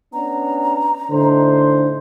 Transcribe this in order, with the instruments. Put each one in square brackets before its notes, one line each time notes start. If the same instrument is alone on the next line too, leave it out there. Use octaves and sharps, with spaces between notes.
[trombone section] B3 C#4 D4 [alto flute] A#5
[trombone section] A2 D#4 C5 [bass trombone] D3